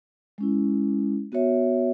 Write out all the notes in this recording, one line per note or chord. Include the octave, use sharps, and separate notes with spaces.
G#3 C#4 E4
B3 F#4 C#5 E5